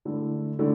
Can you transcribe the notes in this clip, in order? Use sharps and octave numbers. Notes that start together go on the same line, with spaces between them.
D3 A3 E4 A4
D3 A3 E4